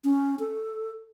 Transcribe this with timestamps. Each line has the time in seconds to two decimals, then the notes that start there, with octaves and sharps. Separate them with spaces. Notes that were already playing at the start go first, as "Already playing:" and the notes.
0.04 C#4
0.39 A4